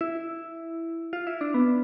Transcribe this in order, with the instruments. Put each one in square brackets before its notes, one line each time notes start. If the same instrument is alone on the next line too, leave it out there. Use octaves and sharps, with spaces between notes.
[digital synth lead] E4
F4
E4
D4
B3